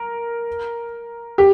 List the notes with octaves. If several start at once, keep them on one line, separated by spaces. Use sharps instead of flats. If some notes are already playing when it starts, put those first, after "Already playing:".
Already playing: A#4
G4